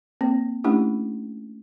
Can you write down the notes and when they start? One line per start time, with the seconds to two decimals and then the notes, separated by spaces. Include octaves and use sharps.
0.21 A#3 C4
0.64 A3 C#4 D4 E4 G4